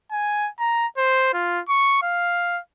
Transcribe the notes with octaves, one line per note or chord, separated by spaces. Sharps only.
G#5
A#5
C5
F4
C#6
F5